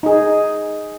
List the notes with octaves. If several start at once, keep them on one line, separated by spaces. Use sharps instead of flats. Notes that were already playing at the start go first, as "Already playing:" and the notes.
D#4 G#4